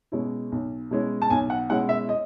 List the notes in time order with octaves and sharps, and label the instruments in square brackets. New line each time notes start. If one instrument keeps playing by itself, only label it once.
[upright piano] B2 G#3 C#4 E4
B1
B2 G#3 C#4 E4
A5
B1 G#5
F#5
B2 G#3 C#4 E4 F#5
E5
D#5